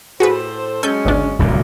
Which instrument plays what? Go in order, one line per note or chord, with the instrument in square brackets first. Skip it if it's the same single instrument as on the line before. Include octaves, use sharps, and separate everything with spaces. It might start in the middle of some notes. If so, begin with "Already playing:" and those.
[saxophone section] A2 A4 C5 [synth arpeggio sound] F#4 G#4 B4
[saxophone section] F#3 G#3 C#4 [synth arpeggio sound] A4 G#5 G6
[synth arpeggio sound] G#1 D2 D4
[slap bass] D1 C2 A#2